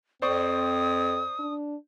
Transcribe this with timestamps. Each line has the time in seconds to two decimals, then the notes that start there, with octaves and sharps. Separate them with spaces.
0.22 F2 C4 C5 D5 C#6 D#6
1.39 D4